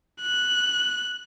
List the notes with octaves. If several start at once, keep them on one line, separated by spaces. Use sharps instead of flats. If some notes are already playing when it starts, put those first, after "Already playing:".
F#6